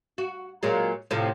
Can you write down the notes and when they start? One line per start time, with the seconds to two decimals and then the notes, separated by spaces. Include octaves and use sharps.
0.18 F#4
0.63 A#2 F#3 G#3
1.11 A2 C3 F3